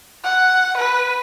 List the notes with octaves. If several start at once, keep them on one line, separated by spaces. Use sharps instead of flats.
F#5
B4